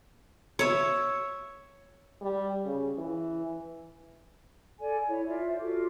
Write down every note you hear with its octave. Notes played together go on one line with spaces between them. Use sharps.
C#5 E5
G3
C#3
E3
A4 D5 G#5
E4 C#5
F4 D5 E5
C5
F4 F#4 A4 D6